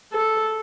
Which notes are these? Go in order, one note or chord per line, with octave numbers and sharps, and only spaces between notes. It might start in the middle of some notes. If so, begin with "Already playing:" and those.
A4